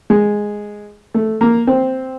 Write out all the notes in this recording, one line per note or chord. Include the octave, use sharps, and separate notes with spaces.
G#3
A3
A#3
C4